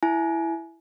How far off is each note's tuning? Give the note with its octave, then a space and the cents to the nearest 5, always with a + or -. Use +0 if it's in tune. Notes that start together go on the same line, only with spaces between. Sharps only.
E4 +5 G#5 +25